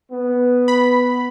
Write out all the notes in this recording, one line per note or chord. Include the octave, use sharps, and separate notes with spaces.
B3
B5